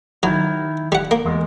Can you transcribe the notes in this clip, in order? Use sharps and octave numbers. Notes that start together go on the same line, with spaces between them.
D#3 F#3 E4
G3 F#5
A#3
E2 G#3